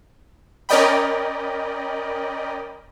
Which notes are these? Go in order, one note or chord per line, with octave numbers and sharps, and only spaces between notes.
C#4 A#4 D5 D#5 G5 B5